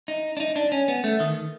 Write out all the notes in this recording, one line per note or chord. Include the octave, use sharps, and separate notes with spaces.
D#4
D4
D#4
D4
C#4
B3
A3
D#3